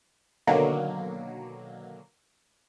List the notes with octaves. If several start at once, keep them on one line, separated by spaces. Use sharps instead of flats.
B2 D3 D#3 F#3 A#3